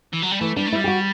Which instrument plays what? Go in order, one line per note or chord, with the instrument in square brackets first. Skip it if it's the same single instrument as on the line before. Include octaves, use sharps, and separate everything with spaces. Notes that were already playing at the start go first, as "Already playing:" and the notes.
[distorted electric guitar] E3
F#3
G3
[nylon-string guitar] E3 [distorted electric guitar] A3
[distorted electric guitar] G3 [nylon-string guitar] D4
[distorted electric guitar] A3
[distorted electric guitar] G3 [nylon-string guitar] E4
[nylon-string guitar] G4
F#4